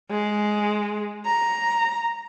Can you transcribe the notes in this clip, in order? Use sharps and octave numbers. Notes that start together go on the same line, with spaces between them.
G#3
A#5